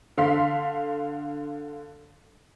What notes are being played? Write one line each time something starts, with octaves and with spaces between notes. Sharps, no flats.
D3 F5 C6 B6